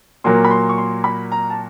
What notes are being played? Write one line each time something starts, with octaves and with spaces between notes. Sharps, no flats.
A#2 F#3 A#3 C6
B5
C6
C#6
C6
B5
A#5
A5